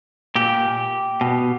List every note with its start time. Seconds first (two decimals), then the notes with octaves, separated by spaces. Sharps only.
0.35 A#2 G4
1.21 B2